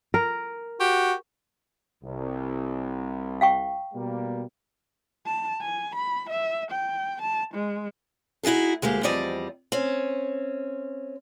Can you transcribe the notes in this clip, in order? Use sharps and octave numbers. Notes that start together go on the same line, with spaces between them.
A#4
F#4 G4
C2
F5 G5 C#6
B2 G3 A#3
A5
G#5
B5
E5
G5
A5
G#3
D#4 E4 F#4 G#4 A4
D2 G#3 A#3 G4
E2 F3 G3 C4 D5 D#5
C4 C#4